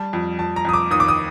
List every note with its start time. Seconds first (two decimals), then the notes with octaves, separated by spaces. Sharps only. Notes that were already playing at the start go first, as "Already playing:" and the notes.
Already playing: G3 A5
0.13 F2
0.39 F2 A5
0.56 A#5
0.65 F2 D#6
0.73 D6
0.91 D#2 D#6
1.00 D6
1.08 D#6